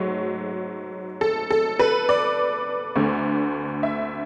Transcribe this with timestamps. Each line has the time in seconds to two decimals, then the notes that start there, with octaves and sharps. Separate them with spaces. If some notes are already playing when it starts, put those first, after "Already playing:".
Already playing: G#2 F#3 A3 C#5
1.21 A4
1.50 A4
1.79 B4
2.09 D5
2.96 D2 D3 A3
3.83 E5